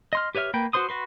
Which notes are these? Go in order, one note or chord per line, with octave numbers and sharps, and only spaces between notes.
D#5 C6 F6
G4 B4 C#5 E5 F6
A#3 B4 G5
F#4 B4 C5 C6 D#6
F#4 B4 C6